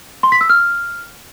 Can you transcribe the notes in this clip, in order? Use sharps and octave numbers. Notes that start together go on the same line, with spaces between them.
C6
B6
E6
F6